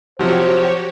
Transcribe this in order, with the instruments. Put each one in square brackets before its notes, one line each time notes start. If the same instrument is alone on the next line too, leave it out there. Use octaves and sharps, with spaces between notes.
[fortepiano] C3 F3 F#3 [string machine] F#4 G4 C#5 [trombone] C5